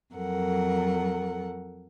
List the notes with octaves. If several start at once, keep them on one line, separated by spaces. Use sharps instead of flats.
F2 F#3 A4 A#4 F#5